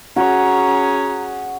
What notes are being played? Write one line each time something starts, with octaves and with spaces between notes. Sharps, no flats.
C#4 F#4 G#4 A#5